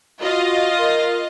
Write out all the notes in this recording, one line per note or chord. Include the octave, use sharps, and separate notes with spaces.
F4 F#4 D#5 F5
A#4